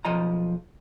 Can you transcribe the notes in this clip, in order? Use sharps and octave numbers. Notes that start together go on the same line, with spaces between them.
B1 F3 D#5 A#5